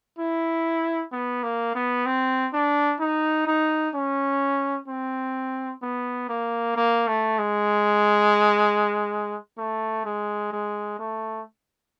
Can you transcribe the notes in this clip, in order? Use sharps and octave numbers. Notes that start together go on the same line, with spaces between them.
E4
B3
A#3
B3
C4
D4
D#4
D#4
C#4
C4
B3
A#3
A#3
A3
G#3
A3
G#3
G#3
A3